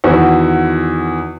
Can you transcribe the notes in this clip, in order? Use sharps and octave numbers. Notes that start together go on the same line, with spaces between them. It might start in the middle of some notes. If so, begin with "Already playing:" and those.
E2 D#3 E4 F#4